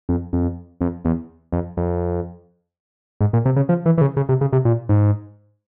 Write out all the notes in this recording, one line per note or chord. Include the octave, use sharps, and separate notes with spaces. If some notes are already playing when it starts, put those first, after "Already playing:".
F2
F2
F2
E2
F2
F2
G#2
A#2
C3
C#3
F3
E3
E3
C#3
C#3
C3
C#3
C3
A#2
G#2